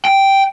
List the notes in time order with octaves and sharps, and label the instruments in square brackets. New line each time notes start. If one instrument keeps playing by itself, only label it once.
[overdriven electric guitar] G5